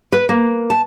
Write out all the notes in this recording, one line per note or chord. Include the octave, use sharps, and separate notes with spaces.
B4
A#3
A5